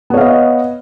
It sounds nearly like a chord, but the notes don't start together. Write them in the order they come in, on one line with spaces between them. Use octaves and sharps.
B3 C#5 F5 D#5